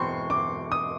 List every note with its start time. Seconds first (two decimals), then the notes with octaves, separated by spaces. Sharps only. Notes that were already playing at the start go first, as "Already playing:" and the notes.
Already playing: E2 B2 G#3 C4 C6 C#6
0.30 D6
0.72 D#6